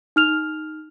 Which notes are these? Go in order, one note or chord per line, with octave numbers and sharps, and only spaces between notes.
D#4 F6 F7